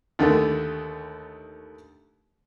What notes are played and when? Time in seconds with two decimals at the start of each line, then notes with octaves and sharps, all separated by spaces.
0.19 D#2 D3 D#3 A3